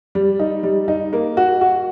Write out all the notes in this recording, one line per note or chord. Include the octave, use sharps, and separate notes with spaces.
G3
D#4
G3
D#4
A#3
F#4
F#4